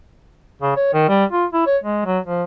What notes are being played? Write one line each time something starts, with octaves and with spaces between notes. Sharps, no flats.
C#3
C#5
D#3
G3
F4
E4
C#5
G#3
F#3
F3